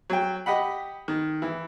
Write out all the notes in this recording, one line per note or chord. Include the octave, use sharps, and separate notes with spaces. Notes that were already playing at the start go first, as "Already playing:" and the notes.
F#3 G5
G4 D#5 F#5 B5
D#3
E3